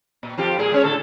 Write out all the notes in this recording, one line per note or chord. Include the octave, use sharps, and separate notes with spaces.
A#2
F2 F4 G4
A#2 G#3 G#4
G#3 C#4 C#5
A2 D3 A4